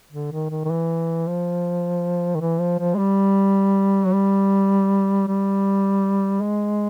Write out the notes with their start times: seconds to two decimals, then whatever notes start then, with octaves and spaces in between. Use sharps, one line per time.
0.12 D3
0.32 D#3
0.50 D#3
0.65 D#3
0.70 E3
1.28 F3
2.35 D#3
2.41 E3
2.60 F3
2.79 F3
2.94 G#3
2.98 G3
4.06 F#3
4.12 G3
5.27 G3
6.41 G#3